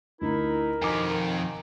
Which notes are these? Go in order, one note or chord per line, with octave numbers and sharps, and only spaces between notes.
D2 D#4 E4 A#4
F2 B2 D#3 D#4 G#5 D6